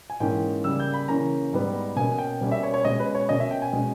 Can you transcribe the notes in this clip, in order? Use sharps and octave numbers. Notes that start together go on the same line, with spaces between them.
G#5
G#2 E3 A#3 C#4 G5
C#3 G3 A#3 E6
G6
B5
C#3 E3 A#3 C#4 A#5
G#2 G3 B3
B2 A#3 C#4 G#5
G5
B2 G3 A#3 C#4
E5
C#5
C#5
B2 G#3 C#4 D#5
B4
C#5
B2 A#3 C#4 D#5
E5
G5
G#5
B2 G#3 C#4